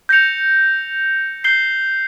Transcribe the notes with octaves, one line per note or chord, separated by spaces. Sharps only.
G6 A#6 C#7 F7
G6 C7 G7